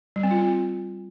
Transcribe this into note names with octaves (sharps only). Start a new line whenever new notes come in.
G3
C4
F4
C4